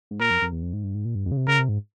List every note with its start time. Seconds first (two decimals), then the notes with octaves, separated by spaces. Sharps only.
0.11 G#2
0.20 A#2 A#4
0.30 F2
0.42 F2
0.52 E2
0.62 F2
0.73 G#2
0.84 G2
0.95 G#2
1.05 A#2
1.15 G2
1.26 F2
1.31 C#3
1.37 C3
1.47 C#3 A#4
1.59 C3
1.69 G#2